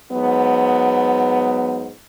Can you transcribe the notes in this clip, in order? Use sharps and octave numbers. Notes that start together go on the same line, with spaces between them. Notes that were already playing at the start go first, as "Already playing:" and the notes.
G#2 F#3 B3